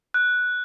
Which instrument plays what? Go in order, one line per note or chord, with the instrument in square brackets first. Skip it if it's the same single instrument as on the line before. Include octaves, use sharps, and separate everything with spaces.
[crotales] F#6